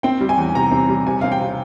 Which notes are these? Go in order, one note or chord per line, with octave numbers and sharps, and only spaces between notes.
C4 G5
G3
G#5
E2
C3 A#5
C4
G3
C3 G#5
C4 F5
G5
C3